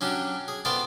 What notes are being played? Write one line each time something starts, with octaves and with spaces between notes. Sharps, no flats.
F#3 C#4 D4 G4
G#4
B3 C4 F4 A4 D5